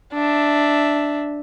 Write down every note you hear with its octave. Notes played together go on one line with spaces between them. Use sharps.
D4 E5